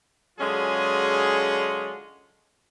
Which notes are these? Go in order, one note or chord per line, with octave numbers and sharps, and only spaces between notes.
D3 F#3 G#3 C#4 F4 G#4